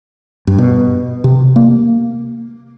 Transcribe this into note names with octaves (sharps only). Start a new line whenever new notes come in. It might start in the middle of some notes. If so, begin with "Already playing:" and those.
G2
B2
C3
A#3